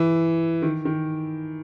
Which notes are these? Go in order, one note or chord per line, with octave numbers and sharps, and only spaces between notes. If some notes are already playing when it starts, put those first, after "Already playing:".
Already playing: E3
D#3
D#3